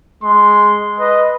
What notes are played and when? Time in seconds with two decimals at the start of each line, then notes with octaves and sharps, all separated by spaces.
0.24 G#3 C6
1.00 B4 D#5